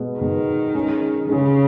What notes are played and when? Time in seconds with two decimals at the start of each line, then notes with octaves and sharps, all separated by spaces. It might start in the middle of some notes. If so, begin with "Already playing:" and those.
Already playing: B2 G#3 B3
0.20 B2 D#3 G#3 B3
0.74 G#3 C#4 G#4
1.29 C#3 G#3 C#4 G#4